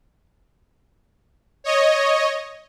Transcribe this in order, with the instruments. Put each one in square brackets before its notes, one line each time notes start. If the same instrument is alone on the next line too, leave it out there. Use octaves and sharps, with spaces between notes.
[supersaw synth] C#5 D#5